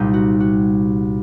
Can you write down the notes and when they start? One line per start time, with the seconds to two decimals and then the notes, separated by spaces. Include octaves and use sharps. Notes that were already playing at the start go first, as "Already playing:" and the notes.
Already playing: C2 A#2 G3 C4 D#4
0.14 F#4
0.40 F#4